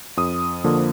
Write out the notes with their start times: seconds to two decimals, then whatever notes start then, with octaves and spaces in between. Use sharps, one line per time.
0.17 F2 D#6
0.64 D3 F3 A#3